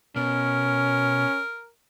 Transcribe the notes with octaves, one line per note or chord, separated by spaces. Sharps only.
B2 C#4 A#4